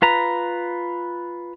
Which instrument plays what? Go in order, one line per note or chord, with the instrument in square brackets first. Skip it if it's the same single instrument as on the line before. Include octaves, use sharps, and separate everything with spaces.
[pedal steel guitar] F4 B4 A#5